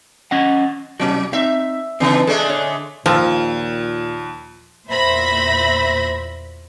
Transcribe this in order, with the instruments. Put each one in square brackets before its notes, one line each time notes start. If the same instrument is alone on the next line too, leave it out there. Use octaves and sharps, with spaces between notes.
[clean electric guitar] C#4 D#5 F#5
[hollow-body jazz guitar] C2 C#4 F#4 [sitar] F#3
[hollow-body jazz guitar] C4 D#4 [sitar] E5
[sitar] C#3 E3 [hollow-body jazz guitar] C4 D#4 A#5
[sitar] G#3 A3 D4 [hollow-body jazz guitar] A4
[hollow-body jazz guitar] D3 C#5
[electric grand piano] D#2 E6 [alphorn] A#2 [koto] F3
[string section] E2 A#2 C5 E5 B5 A#6